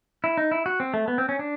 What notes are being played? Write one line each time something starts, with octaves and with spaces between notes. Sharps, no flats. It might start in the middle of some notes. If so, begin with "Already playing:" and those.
E4
D#4
E4
F#4
C4
A3
B3
C4
C#4
D4